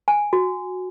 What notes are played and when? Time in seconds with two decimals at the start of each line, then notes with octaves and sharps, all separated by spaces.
0.08 G#5
0.33 F#4